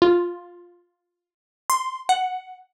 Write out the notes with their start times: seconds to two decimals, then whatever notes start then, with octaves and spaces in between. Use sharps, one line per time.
0.02 F4
1.70 C6
2.09 F#5